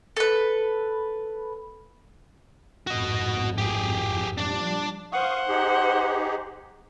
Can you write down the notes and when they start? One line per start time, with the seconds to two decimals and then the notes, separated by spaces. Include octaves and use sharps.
0.17 A4 B4
2.87 G#1 F2 A2 F#4 D#5
3.58 G4 G#4
4.38 A#2 F3 G3 D4 D5
5.13 C5 F5 F#5 C#6 D#6
5.48 D#4 G4 G#4